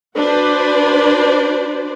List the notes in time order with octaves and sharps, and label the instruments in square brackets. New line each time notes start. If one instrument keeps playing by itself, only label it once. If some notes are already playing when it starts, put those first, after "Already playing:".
[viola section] D4 F#4 B4 C5 D5